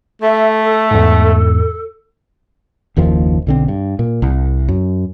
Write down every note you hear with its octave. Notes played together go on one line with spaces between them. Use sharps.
A3 E5
A4
E2 G#2
F#1 D#2 D#3 F3
B1 D3 C4
G2
A#2
C2
F#2